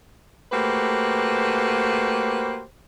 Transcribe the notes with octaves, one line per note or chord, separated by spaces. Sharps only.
A3 A#3 F#4 G4 B4 C5